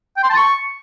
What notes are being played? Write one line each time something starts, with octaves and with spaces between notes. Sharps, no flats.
G5
C6
A5
C#6